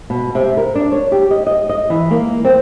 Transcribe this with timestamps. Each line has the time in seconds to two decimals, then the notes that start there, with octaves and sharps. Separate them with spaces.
0.10 B2
0.35 C3
0.57 A#4
0.75 D4
0.92 C#5
1.12 G4
1.31 D#5
1.47 D#5
1.69 D#5
1.90 E3
2.11 A#3
2.45 C4